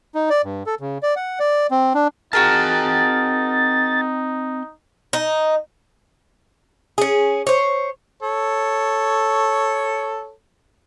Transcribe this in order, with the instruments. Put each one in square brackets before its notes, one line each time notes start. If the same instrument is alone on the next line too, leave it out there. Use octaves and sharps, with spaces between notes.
[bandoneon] D#4
D5
G2
A4
C#3
D5
F#5
D5
C4
D4
[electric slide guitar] C4 G5 A5 [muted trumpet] D#4 [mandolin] F#4 G#4 A#4 [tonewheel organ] A6
[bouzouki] D#4
C#4 G#4
C5 C#5
[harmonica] A4 C#5